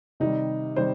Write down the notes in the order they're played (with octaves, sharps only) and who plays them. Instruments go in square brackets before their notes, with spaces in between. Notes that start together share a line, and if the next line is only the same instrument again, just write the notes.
[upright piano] C3 D#3 G3 D#4
C3 D#3 G3 C5